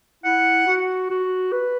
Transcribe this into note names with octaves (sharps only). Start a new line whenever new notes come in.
E4 F#5
F#4
F#4
B4